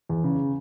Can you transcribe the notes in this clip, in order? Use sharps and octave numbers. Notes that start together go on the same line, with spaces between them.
E2
C#3